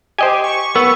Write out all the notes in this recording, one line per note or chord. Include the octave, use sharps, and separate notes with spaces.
G4 C5 D#5 G#5
C#6
B3 A#4